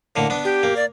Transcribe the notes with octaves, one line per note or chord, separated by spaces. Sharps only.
A2 D3 A#3
B3 D4
G4
A#3
D5